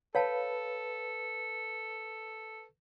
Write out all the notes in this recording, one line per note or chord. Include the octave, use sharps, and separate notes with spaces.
A4 B4 C#5 F5 A5